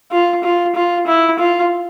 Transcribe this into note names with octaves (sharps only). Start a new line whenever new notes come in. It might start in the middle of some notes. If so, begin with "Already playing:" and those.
F4
F4
F4
E4
F4